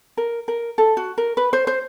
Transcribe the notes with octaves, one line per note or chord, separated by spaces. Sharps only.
A#4
A#4
A4
F#4
A#4
B4
C5
C5